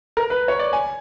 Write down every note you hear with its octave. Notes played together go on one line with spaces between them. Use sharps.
A#4
B4
C#5
D5
G#5